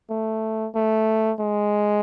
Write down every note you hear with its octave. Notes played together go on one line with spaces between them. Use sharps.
A3
A3
G#3